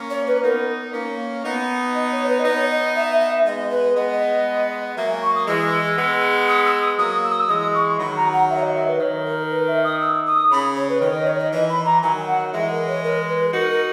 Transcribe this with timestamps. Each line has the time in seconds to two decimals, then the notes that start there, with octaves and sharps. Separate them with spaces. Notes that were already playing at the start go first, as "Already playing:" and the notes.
Already playing: A#3 C#4
0.10 C#5
0.27 B4
0.43 B3 D#4 A#4
0.93 A#3 C#4
1.44 B3 D#4
1.95 D#5
2.11 C#5
2.28 B4
2.39 D#5
2.45 B3 D#4 C#5
2.70 D#5
2.95 E5
3.20 E5
3.45 G#3 B3 D#5
3.71 B4
3.95 G#3 B3 D#5
4.97 F#3 A#3 E5
5.09 G#5
5.22 C#6
5.35 D#6
5.47 E3 G#3 E6
5.98 G#3 B3
6.48 D#6
6.65 E6
6.81 D#6
6.98 F#3 A#3 D#6
7.24 E6
7.31 D#6
7.40 E6
7.49 E3 G#3 D#6
7.74 C#6
7.99 D#3 F#3 B5
8.16 A#5
8.33 F#5
8.50 E5
8.56 C#5
8.62 D#5
8.75 E5
8.87 B4
9.00 D#3 C#5
9.25 A#4
9.50 B4
9.67 E5
9.84 D#6
10.01 E6
10.26 D#6
10.51 C#3 B5
10.76 C#5
10.89 B4
11.01 D#3 C#5
11.15 D#5
11.27 C#5
11.39 D#5
11.52 E3 D#5
11.69 B5
11.85 A#5
12.02 D#3 F#3 G#5
12.27 F#5
12.52 E3 G#3 E5
12.69 A#4
12.86 C#5
13.03 A#4
13.28 B4
13.53 D#4 F#4 A#4
13.70 A#4